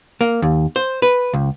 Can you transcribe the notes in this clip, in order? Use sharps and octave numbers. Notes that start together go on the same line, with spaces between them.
A#3
D#2
C5
B4
C#2